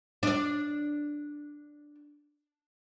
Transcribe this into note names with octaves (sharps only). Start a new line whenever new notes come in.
D4 D5